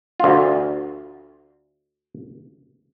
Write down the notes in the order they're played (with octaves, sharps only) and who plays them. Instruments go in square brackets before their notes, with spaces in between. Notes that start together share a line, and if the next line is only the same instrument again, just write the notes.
[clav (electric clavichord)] D2 F4